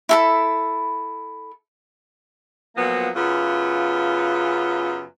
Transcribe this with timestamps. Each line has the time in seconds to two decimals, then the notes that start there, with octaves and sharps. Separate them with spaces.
0.09 E4 A4 B5
2.77 A#2 F3 F#3 A#3 B3
3.15 F#2 C#3 B3 F4